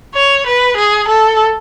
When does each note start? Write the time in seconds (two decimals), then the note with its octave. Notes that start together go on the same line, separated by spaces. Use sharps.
0.15 C#5
0.46 B4
0.76 G#4
1.08 A4